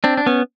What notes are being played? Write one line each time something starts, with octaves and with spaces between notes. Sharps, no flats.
C4 D4
D4
B3 C#4